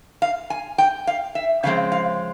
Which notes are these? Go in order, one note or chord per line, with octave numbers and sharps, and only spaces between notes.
F5
G#5
G5
F5
E5
C#3 F3 G#3 C4 F5
F5